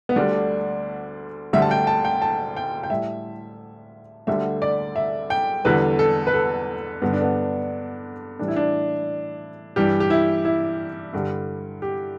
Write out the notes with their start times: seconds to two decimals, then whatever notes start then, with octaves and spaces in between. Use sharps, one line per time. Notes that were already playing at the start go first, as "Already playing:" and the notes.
0.09 B3
0.16 D2 D3 G3 D4
1.53 D2 D3 G3 E5
1.62 A5
1.71 G5
1.87 A5
2.05 G5
2.22 A5
2.57 G5
2.83 G5
2.90 A2 G3 E5
4.27 D2 D3 G3 E5
4.62 D5
4.96 E5
5.30 G5
5.65 E2 D3 G3 B4
5.99 A4
6.27 B4
6.34 A4
7.02 G2 D3 G3 B3
7.13 D4
7.22 B3
8.39 A2 E3 G3 D4
8.48 E4
8.56 D4
9.76 G2 E3 G3 G4
10.00 G4
10.10 E4
10.45 E4
11.13 G2 D3 G3
11.82 G4